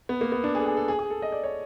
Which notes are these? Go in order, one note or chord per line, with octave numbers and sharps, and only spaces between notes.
B3
A#3
B3
D4
G#4
A4
G#4
A4
G#4
G#4
A4
D#5
D5
C#5